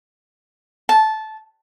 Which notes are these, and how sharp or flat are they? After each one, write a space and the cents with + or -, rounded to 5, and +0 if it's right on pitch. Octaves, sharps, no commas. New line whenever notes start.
A5 -15